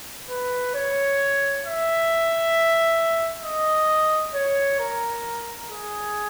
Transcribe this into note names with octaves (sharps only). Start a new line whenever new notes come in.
B4
C#5
E5
D#5
C#5
A#4
G#4